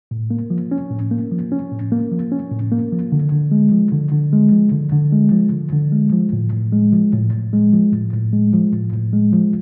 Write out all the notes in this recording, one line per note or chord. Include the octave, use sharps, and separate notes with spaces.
A2
A#3
F3
C#4
A2
A#3
F3
C#4
A2
A#3
F3
C#4
A2
A#3
F3
D3
D3
G#3
F3
D3
D3
G#3
F3
D3
D3
G#3
F3
D3
D3
G#3
F3
A2
A2
G#3
F3
A2
A2
G#3
F3
A2
A2
G#3
F3
A2
A2
G#3
F3